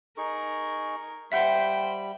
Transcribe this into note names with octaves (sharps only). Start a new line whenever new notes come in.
D#4 G#4 A#4 C#6
G3 C5 E5 F#5 G5 B5